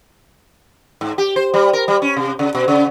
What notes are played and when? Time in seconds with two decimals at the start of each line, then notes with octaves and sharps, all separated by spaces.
1.01 G#2
1.18 G4
1.36 C5
1.54 G3
1.73 A#4
1.88 G3
2.02 C#4
2.17 C3
2.39 C#3
2.55 B2
2.68 C#3